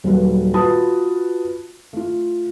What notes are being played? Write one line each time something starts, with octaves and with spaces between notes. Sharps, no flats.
D#1 F#3 B4
F4 F#4 B4 A5 B5 D#6
A3 F4